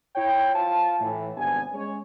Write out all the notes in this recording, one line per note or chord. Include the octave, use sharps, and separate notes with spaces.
E4 C#5 G5
F4 C5 F5 A5
A2 E3
G#1 G2 C3 B3 D4 G#5
G#3 C#4 C#5